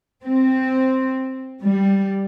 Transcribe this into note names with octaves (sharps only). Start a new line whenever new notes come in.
C4
G3